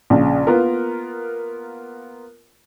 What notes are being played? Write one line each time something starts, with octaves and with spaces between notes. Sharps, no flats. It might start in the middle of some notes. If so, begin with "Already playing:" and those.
A#1 C#3
A#3 B3 F4 A#4